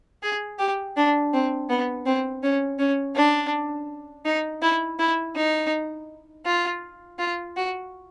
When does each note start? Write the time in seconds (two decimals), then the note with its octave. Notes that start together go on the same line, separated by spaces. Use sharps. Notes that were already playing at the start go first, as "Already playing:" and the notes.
0.23 G#4
0.59 G4
0.97 D4
1.33 C4
1.70 B3
2.06 C4
2.43 C#4
2.79 C#4
3.15 D4
4.25 D#4
4.62 E4
4.99 E4
5.36 D#4
6.45 F4
7.19 F4
7.56 F#4